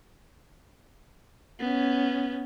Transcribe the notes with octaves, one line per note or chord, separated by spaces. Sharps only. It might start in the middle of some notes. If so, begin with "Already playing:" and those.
B3 C#4